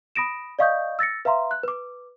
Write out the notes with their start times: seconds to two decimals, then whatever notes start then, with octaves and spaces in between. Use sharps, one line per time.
0.16 B5 D#6 A#6 D7 E7
0.59 D5 D#5 F5 C#6 D#6 G6
0.99 E6 A6 A#6 C#7
1.25 B4 E5 F5 A#5 C6
1.51 F#6
1.63 B4 D6